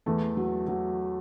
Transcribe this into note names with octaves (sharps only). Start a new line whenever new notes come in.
E2 A3
F#3
F#3